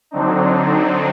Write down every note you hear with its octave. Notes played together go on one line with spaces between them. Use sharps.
D3 F#3 C4 D4 D#4